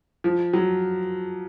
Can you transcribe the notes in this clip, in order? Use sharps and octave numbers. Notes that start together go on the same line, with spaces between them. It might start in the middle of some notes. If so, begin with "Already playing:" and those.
F3
F#3